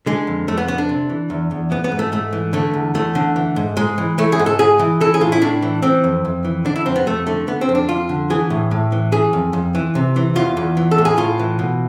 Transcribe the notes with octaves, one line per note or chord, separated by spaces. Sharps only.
D3 G#3
F2
F2 A3
B3
D3 B3
D4
C3
E3
E2
E2
E3 B3
B3
G#2
A3
G#2 A3
E3
D3 A3
E2
E2 A3
D3
E3
G#2
G#2 G#3
E3
E3 A3
G#4
G#2
A4
G#2 G#4
E3
E3 A4
G#4
A2 F4
E4
A2 D4
E3
E3 C4
F2
F2
E3
D3 D4
E4
F2 C4
B3
F2 A3
D3 A3
D3 B3
C4
F2
D4
F2 F4
D3
E3 G#4
A2
A2
E3
E3 G#4
F2
F2
E3
C3
E3
E2 F4
E2
E3
A4
A2
G#4
A2 F4
E3
B2